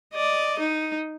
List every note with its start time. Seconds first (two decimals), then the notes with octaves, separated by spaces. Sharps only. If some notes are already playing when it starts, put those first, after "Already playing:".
0.14 D5 D#5
0.60 D#4